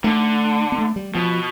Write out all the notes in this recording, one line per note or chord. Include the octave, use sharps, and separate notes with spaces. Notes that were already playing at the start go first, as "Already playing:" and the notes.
D3 A3
B3
A3
G3
B2 F3